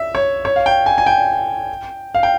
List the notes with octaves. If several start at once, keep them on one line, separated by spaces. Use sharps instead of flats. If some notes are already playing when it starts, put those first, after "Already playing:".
Already playing: E5
C#5
C#5
F5
G5
G#5
G#5
G5
F5
G5